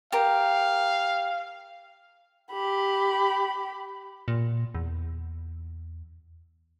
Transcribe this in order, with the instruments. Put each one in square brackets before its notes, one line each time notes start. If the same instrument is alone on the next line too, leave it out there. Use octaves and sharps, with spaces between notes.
[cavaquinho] G4 A#4 [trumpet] F5
[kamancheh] G4 B5
[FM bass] A#2
E2